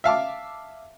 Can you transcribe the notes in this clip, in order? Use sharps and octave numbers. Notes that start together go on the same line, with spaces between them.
E5 F5 A5 D6